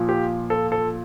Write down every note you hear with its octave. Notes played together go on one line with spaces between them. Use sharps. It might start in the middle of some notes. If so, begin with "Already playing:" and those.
Already playing: A#2 F3
G4
A4
A4